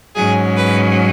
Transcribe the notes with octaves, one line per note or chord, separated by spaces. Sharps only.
G#2 F#3 C#4 G#4
B4